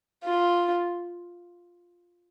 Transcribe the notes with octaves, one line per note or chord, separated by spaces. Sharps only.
F4